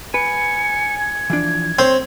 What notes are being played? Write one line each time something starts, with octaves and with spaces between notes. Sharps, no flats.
B4 G#5 C#7
G#6
E3 F3 D4
C4 C#5 C6